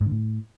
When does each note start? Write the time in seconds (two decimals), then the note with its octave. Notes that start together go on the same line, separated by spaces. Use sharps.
0.01 G#2
0.06 D3
0.12 A2